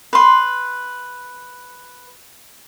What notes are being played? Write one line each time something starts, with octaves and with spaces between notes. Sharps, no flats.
B4 C6